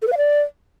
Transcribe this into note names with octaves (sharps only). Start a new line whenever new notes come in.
A4
B4
F5
D5